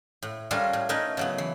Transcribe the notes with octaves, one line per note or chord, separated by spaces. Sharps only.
A2
G3 C#4 D4 F4 A4 A#4
A2
A3 C#4 D#4 A#4 B4
C#3 F#3 B3
E3